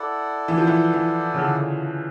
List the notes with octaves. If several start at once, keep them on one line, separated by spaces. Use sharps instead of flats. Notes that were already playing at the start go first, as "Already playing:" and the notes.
Already playing: E4 A4 D5 F#5
E3
F3
E3
E3
C#3
D3